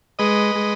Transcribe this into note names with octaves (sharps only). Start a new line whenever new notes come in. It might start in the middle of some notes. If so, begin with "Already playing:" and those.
G#3 B4 D#5
G#3